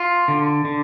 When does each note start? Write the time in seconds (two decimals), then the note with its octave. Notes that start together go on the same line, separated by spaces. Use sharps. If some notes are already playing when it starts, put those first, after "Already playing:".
Already playing: F4
0.28 D3
0.65 D3